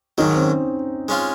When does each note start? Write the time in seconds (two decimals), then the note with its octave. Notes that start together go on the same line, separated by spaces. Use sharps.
0.18 G#2 D#3 F#3 D#4
0.35 C4
0.40 C#4
1.08 G#3 C#4 F4